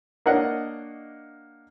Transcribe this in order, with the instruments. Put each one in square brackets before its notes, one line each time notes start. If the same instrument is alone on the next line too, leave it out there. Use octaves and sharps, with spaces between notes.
[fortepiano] A#3 D4 C#5 D#5 F#5